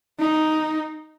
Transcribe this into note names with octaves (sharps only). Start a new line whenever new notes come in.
D#4